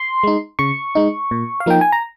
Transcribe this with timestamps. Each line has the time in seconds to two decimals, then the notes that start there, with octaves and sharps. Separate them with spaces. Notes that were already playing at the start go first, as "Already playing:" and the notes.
Already playing: C6
0.23 G#3 D#4
0.59 C#3 C#6
0.95 G#3 D#4
1.31 A#2
1.60 F5
1.66 F3 A#3 D#4 G5
1.81 G#5
1.92 A#5